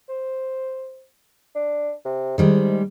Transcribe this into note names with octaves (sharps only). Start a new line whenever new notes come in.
C5
D4
C3
G#2 D#3 G3 G#3